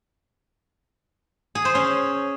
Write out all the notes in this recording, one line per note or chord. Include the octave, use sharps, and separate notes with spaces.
G#4
C5
C#4